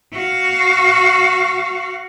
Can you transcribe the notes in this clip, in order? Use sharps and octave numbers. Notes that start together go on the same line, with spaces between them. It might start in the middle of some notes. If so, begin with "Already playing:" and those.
F#4 F5